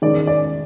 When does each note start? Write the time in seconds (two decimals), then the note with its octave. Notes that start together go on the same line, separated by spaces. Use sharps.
0.02 D#3 G#3 C#4 D5
0.27 D5